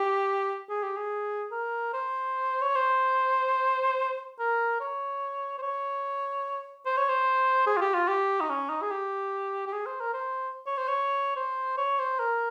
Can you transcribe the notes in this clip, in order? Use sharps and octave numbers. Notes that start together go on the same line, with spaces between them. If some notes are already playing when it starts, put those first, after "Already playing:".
Already playing: G4
G#4
G4
G#4
A#4
C5
C#5
C5
A#4
C#5
C5
C#5
C5
C#5
C5
G#4
F4
G4
F4
G4
D#4
C#4
D#4
G#4
G4
G4
G#4
C5
A#4
C5
C#5
C5
C#5
C5
C#5
C5
A#4